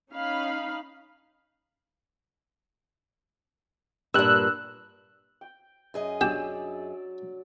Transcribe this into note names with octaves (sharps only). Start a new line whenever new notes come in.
C#4 D#4 F5 B5
G2 A#2 E6 F#6
G5
F#2 G#4 D#5
F#3 D4 G4 D5 E6